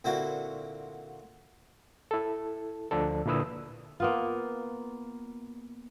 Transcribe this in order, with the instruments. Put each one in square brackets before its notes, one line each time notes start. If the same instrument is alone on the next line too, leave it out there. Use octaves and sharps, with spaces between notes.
[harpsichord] A#2 D3 C4 E4 F#4
[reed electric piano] E4 A4
D2 F3 D4 A4
A#2 D3 E4 B4 D#6 E6
[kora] A#3 B3 F4